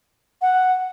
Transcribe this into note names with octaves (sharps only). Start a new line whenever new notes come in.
F#5